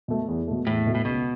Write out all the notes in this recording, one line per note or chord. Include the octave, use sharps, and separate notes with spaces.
B2 A3
E2
B2 A3
E2 A2
B2 A3
A2
C#2 B2